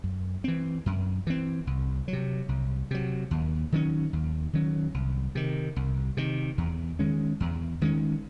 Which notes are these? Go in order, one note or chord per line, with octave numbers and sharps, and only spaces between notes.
F#2
E3 C4
F#2
E3 C4
C2
F#3
C3
C2
C3 F#3
D#2
D#3 F#3 C#4
D#2
D#3 F#3 C#4
C2
C3 D#3
C2
C3 D#3
E2
D#3 G#3 C#4
E2
D#3 G#3 C#4